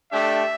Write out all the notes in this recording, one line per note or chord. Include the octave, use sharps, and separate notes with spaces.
A3 D4 G4 E5